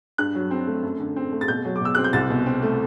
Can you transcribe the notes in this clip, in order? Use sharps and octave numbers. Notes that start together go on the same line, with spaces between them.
G2 F#6
F#3
C4
A3
F#2
D3
C4
A3
A6
B2 G6
F#3
D6
B2 E6
C4 F#6
G6
C2 A6
B2
C4
A3